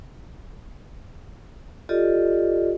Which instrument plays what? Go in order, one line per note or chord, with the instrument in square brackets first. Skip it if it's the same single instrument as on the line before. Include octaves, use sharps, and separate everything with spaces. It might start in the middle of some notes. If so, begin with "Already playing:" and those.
[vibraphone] F4 G4 A4 D5 D#5